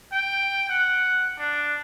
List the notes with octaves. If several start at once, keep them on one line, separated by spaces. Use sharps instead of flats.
G5
F#5
D4